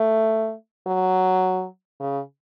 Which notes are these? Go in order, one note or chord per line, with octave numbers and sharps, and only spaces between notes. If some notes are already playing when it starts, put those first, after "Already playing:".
Already playing: A3
F#3
C#3